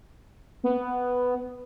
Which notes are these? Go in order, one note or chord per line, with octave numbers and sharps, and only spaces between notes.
B3